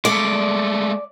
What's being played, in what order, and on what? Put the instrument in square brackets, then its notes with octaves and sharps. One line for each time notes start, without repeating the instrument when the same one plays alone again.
[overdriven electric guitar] G#3 A3 [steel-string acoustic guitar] D5